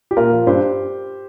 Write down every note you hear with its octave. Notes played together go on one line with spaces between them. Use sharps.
G4
A#2 F4 A#4
F3
G2 G4 C5